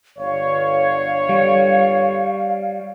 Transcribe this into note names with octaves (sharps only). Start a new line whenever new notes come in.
G1 C#5 F5
G3